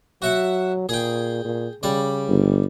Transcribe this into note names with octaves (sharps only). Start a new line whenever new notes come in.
F#3 F#4 E5 F#5
A#2 G#4 G5
A#2
C#3 G3 D5
G1